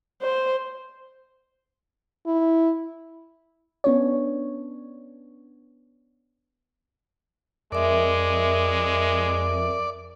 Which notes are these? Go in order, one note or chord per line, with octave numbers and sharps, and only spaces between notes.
C5
E4
B3 C#4 D4 C#5
F2 G#3 A#4 D5 E5